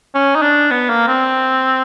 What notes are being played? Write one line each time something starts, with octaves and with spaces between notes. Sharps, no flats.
C#4
D#4
D4
B3
A#3
C4